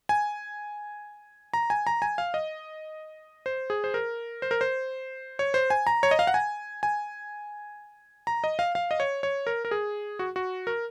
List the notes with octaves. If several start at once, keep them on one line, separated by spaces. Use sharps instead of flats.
G#5
A#5
G#5
A#5
G#5
F5
D#5
C5
G#4
C5
A#4
C5
A#4
C5
C#5
C5
G#5
A#5
C#5
D#5
F5
F#5
G#5
G#5
A#5
D#5
F5
F5
D#5
C#5
C#5
A#4
A#4
G#4
F#4
F#4
A#4